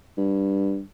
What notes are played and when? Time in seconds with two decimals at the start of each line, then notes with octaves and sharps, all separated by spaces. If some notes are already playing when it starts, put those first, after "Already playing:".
0.17 G2